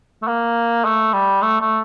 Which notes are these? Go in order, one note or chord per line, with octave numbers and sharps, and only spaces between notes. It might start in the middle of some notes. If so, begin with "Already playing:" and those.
A3
A#3
A3
G3
A3
A3